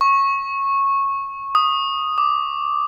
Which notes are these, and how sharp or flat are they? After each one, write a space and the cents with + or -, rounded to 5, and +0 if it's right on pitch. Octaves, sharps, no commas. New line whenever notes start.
C#6 -15
D#6 -5
D6 +0